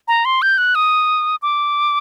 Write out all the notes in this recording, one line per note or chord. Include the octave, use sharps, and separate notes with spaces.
A#5
C6
G6
F#6
D#6
D6